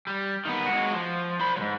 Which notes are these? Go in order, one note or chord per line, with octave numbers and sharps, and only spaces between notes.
G3
D#3 B3
G#3 F#4
F3
C5 B5
G#2 F#3